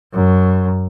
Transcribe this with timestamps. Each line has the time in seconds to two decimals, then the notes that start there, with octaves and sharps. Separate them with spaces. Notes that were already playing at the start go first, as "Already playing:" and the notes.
0.14 F#2